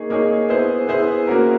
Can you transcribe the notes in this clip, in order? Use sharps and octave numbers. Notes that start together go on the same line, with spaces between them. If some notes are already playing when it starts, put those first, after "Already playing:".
Already playing: A#3 D#4 G#4 C#5
A#3 D#4 G#4 C#5
B3 E4 G#4 C5
B3 E4 G#4 C5
A#3 C#4 F#4 A#4